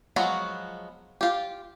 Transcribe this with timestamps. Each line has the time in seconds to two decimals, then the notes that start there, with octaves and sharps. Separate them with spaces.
0.16 F3 F#3 G#3 B3 F#4
1.21 F4 G4